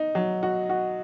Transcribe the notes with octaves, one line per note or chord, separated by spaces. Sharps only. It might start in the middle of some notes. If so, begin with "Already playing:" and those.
Already playing: D#4
F#3
F#4
F#4